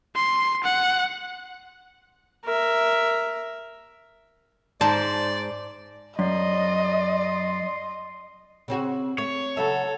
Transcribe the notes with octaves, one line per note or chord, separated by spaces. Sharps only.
C6
F#5
A#4 E5
G#2 C5 D5 A5
F#2 D5 D#5 C6
C#3 C4 F#4
A3 C#5
C#3 F#3 A4 E5